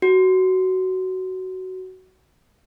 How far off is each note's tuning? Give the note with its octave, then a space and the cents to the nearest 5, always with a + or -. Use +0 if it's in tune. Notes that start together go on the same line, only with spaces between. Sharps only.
F#4 +15